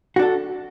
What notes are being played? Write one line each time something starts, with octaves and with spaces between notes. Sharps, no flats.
D4 F#4 A4